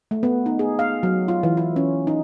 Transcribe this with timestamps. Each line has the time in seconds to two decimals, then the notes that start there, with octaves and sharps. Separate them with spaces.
0.11 A3
0.23 B3
0.46 D#4
0.59 G#4
0.79 F5
1.03 F#3
1.28 F4
1.43 E3
1.57 E4
1.76 C#4
2.07 D#4